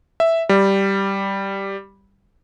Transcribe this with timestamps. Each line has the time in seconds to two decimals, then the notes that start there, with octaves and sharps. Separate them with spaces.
0.20 E5
0.49 G3